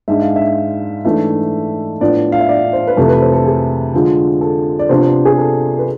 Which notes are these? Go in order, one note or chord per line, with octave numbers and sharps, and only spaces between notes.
G#2 G#3 D4 E5
F5
E5
G#2 E3 A3 D4 E5
A2 F3 B3 D4 D5
F5
E5
D5
C5
B4
F2 C3 E3 A3 A4
B4
C5
A4
G#4
D3 F3 G#3
A4
D5
C3 F3 B3 D4 C5
C5
G#4
A4
B4